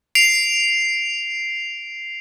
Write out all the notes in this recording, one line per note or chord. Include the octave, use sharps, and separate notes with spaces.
C7 D7 F7